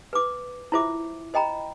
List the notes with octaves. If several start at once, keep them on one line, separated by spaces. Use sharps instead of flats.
B4 D6
E4 F4 C5 E5 D6
C5 D#5 G5 A#5 B5